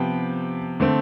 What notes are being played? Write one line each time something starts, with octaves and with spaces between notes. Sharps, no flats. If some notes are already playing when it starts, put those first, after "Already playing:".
Already playing: C3 F3 B3 G5
D3 A3 C4